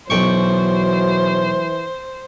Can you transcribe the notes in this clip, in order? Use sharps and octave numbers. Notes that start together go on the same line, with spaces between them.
B1 E3 F#3 C5 G5 C#6